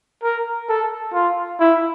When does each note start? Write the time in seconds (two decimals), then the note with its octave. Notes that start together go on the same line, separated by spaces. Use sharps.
0.23 A#4
0.69 A4
1.14 F4
1.60 E4